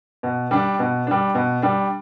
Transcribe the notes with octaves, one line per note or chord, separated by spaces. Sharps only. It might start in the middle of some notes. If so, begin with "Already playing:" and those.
B2
G3 D4
B2
G3 D4
B2
G3 D4